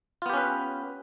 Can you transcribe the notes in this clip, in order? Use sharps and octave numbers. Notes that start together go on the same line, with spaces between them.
B3 C#4 F4 G4 B4